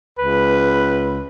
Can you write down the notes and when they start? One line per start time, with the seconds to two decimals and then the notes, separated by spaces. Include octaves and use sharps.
0.19 C#2 B4